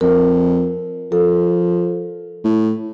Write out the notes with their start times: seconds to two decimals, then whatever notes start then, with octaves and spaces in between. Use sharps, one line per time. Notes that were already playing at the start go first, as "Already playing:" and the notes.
0.01 F2 A#4
1.12 F3 A4
2.44 A2